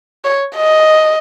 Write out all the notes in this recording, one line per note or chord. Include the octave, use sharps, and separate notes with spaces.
C#5
D#5